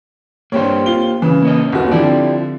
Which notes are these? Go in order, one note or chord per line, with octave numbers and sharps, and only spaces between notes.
G2 A#3 G4 C5 C#5
F4 G7
C#3 E3
A#3 C#4 D#5
G1 D#2 F#4
D3 F3 C4 E4 G4 D5